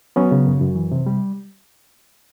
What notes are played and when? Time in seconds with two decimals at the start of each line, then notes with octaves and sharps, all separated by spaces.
0.16 F#3 B3 C#4
0.31 C#3
0.47 F#2
0.61 F#2
0.76 E3
0.92 C3
1.06 G3